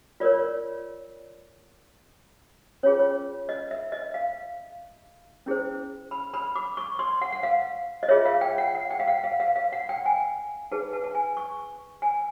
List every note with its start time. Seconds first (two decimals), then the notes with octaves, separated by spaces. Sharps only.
0.20 F4 A#4 C#5 D5
2.83 C#4 F4 G#4 C#5
2.99 C#5
3.49 D#5
3.71 E5
3.92 D#5
4.14 F5
5.46 C#4 E4 G#4 C5
6.11 B5
6.34 B5
6.56 D6
6.77 C#6
6.99 C6
7.22 F#5
7.32 F#5
7.43 F5
8.03 D#5
8.08 F4 G#4 C#5 E5
8.26 F5
8.41 G5
8.58 F#5
8.75 F#5
8.91 G5
9.00 F5
9.08 F#5
9.24 F5
9.40 F5
9.56 F5
9.73 F#5
9.89 G5
10.05 G#5
10.72 D#4 G#4 B4 A5
10.93 A5
11.04 A5
11.15 G#5
11.37 C#6
12.02 G#5